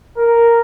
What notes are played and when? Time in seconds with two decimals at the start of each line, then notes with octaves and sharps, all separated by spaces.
0.17 A#4